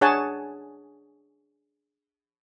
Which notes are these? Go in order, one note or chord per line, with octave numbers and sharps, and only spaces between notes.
D4 G#4 C#5 F#5 G#5 A5